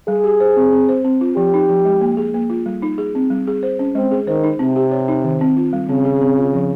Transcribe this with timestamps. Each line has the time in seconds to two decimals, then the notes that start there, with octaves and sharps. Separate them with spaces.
0.08 G3 G#4
0.24 G4
0.40 C5
0.56 C4
0.73 C4
0.89 C5
1.05 C4
1.21 F4
1.37 F3 G4
1.54 D#4
1.69 F3
1.85 G#3
2.01 A#3
2.17 G#4
2.34 A#3
2.50 F4
2.66 G3
2.82 D#4
2.98 G#4
3.15 C4
3.30 G3
3.47 G#4
3.63 C5
3.79 C#4
3.95 G#3 C4
4.11 G#4
4.27 D#3 C5
4.44 D#4
4.59 C3 C4
4.76 G4
4.92 C#5
5.08 D#4
5.24 D#3
5.41 C4
5.57 F4
5.73 G3
5.89 C#3 C4
6.05 G#4
6.21 C4
6.37 F4
6.54 F3